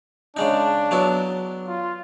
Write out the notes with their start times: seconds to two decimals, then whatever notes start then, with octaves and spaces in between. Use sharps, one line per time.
0.37 C#3 G#3 D4 D#4
0.91 F#3 B3 E4
1.67 F4